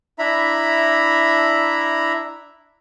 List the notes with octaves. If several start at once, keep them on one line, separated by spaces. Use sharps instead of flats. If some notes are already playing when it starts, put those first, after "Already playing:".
D4 E4 E5 A#5 B5